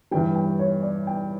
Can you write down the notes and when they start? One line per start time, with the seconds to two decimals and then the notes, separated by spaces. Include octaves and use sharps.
0.11 G2 E3 G3 G5
0.35 G5
0.59 C#5
0.83 D5
1.07 G5